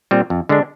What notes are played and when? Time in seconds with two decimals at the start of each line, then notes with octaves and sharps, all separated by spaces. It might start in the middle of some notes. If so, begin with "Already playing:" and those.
0.11 A#2 G3 C4
0.30 F2
0.49 D3 G#3 D4